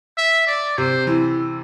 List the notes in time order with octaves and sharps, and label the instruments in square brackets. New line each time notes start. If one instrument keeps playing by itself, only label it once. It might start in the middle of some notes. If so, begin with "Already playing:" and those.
[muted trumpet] E5
D5
[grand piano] C3 [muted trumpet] C5
[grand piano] E3